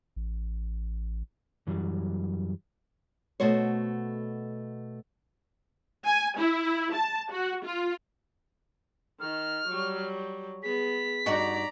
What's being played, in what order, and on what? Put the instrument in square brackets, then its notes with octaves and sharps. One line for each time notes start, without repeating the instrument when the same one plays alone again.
[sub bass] A1
[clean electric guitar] F#2 E3 F#3 G3
[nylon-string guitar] B2 A3 F#4 C5 C#5
[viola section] G#5
E4
A5
F#4
F4
[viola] D#3 [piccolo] F6
[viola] F#3 G3
[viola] B3 G#4 [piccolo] B6
[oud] G2 D#4 F#4 [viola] D5 A#5